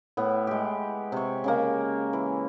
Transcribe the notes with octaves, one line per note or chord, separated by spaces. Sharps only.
A2 B3
G#3 G4
C3 C#5
C#3 G#3 A#3
E3